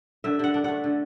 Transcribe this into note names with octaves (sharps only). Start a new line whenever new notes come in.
D3 E5
D3 F#5
D4
A3 F#5
D3